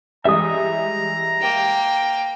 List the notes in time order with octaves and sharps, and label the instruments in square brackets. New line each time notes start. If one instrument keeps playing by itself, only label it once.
[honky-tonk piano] E3 G3 G#3 [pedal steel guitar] E5 D#6 [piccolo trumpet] A#5
[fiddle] A#3 G5